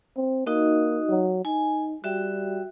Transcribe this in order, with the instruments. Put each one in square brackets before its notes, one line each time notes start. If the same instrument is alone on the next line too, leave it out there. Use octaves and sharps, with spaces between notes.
[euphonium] C4
[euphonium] A#3 [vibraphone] D#4 F#4 D#5
[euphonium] F#3
[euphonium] D#4 [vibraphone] G#5
[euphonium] G3 [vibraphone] F#4 E5 G5